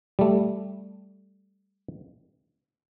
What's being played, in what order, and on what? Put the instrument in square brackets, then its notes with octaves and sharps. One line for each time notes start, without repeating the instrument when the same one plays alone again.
[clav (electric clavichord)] G3 A3